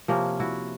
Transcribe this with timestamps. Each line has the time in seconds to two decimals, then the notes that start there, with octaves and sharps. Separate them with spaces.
0.08 C3 F3 A#3 C#4
0.40 E4 F#4